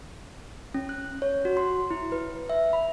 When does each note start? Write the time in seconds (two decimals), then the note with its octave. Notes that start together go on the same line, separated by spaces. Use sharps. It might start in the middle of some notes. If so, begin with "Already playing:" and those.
0.74 C#4
0.89 F#6
1.22 C#5
1.45 F#4
1.57 C6
1.91 E4
2.12 B4
2.49 E5
2.73 B5